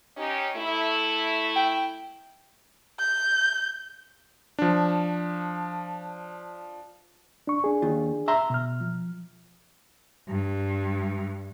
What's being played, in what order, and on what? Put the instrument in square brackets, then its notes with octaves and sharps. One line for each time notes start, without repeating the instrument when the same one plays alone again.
[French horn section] C#4 D#4 G4
A3 E4
[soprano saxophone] G5
[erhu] G6
[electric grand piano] F3 D4
[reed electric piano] D4 C#6
D4 G#4
[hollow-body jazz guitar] D#2 F4
E5 A#5 C6
[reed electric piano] B2 F6
F3
[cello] G2